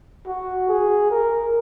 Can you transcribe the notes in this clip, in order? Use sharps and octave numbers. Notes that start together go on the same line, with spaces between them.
F#4
G#4
A#4